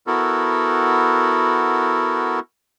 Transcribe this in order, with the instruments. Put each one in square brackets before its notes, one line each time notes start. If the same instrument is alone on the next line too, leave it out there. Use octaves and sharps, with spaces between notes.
[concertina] B3 E4 F#4 A4 A#4